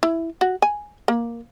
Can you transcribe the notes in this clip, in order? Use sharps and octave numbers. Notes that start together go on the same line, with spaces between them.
E4
F#4
G#5
A#3